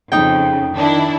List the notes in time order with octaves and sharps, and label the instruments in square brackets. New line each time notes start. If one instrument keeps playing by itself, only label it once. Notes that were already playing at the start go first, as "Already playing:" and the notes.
[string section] F2 C#3 [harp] D#4 G5
[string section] D#3 D4 E4